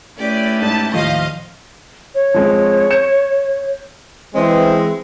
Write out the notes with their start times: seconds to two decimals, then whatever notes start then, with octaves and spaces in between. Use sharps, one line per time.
0.18 A3 C#4 E4 G4 B4 D5
0.62 G#2 A5
0.92 D#2 A2 F3 C5 D#5 F5 C#6
2.15 C#5
2.34 F3 G#3 C4
2.91 G6 C#7 E7
4.35 E3 G#3 C4